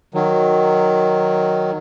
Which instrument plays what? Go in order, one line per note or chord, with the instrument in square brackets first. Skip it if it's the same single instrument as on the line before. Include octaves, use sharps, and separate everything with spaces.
[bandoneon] D#3 F#3